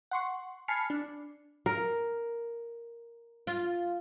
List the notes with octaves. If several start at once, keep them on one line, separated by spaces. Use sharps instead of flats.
F#5 C6 C#6
G#5 A5 B5 F6 C7 C#7
D4
A#4
F4